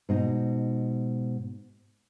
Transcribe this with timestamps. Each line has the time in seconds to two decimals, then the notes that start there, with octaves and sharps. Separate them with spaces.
0.09 G#2 B2 D#4